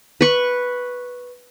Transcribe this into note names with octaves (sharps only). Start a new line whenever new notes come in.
B4 C#6